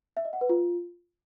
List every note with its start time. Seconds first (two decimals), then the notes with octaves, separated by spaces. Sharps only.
0.17 E5
0.25 D#5
0.33 F#5
0.41 B4
0.49 F4